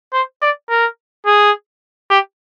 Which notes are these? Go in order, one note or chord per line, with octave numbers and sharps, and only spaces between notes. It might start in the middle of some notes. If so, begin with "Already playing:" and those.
C5
D5
A#4
G#4
G4